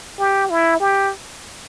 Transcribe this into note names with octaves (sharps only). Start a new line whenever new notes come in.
G4
E4
G4